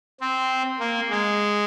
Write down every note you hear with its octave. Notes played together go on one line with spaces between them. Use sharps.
C4
A#3
G#3